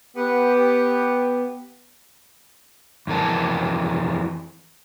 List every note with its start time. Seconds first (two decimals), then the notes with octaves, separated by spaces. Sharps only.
0.17 B3 G4
3.07 F2 E3 A#4 A5